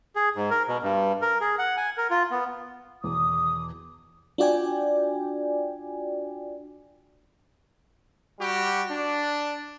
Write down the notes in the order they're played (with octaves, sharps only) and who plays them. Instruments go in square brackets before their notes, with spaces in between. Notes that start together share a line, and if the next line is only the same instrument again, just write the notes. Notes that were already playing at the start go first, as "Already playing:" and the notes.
[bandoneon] G#4
G#2
A#4
B2
G2
A#4
G#4
F#5
G#5
A#4
F4
B3
[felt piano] E2 B2 [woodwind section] D#3 D6 D#6
[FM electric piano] D4 F4 F#4 D5 G5 G#5
[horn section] G3 F#4 G4
D4